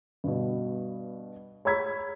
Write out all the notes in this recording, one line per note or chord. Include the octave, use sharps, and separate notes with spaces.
G2 B2
C#5 A#5 B5 E6 G#6 B6